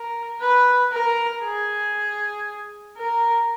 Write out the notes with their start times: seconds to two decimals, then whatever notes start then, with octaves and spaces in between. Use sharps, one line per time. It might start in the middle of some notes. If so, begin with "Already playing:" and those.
Already playing: A#4
0.41 B4
0.92 A#4
1.43 G#4
2.97 A#4